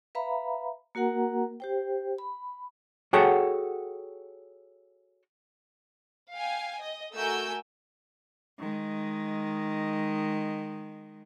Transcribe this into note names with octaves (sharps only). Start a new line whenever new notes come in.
B4 E5 F5 A#5 B5
A#3 F#4 A#4 F#5 A#5
G4 C5 G5
B5
F#4 G#4 A4 C#5 F#5 G5
F5 G5 G#5
D#5
A3 F#4 A#4 G#5 E6 G6
D#3 G#3